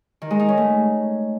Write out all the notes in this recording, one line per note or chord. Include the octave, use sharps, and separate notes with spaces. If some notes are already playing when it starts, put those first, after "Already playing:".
D#3
G#3
D#4
C#4
A3